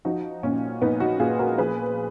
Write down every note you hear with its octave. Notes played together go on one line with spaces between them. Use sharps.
F3 D#4 F#4
A#2 C#4
A#2 B3 D#4
D#4 F#4
A#2 F4 G#4
F#4 A#4
F3 G#4 B4